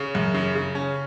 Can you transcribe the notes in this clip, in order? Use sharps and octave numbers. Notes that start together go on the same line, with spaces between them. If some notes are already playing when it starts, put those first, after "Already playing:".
Already playing: C#3
F#2
C#3
C#3
C#4